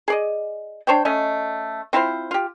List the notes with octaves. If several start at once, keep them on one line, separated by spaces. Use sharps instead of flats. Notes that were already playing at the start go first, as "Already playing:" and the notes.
G#4 D5 D#5
D4 C5 C#5 G5
A3 C#4 D#5
C4 E4 F4 C5
F4 G4